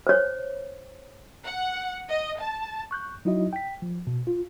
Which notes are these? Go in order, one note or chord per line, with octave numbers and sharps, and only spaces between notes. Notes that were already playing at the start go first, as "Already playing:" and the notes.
C5 C#5
F#5
D#5
A5
C#6 F#6 G6
F#3 D#4 E4 F#4 D#5
G5 B6
F3
B2
F4